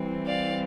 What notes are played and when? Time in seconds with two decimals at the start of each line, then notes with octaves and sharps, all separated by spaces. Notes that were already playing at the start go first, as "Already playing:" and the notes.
Already playing: E3 G3 C4
0.27 D5 F5